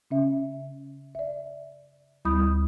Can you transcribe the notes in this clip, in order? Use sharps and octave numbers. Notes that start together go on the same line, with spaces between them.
C#3 C#4 E5
D5 E5
D2 G3 E4 B5 D#6 G6